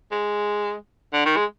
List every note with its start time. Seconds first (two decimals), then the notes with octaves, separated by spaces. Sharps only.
0.12 G#3
1.13 D3
1.25 D#3
1.36 G#3